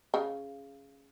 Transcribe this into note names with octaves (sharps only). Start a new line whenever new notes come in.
C#3